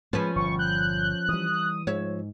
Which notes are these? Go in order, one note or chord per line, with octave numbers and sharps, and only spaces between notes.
F3 G#3 A3 C#4 B4
G1 A#2 C#6
F#6 G6
E3 G3 D#6
G#2 F3 C#5 E5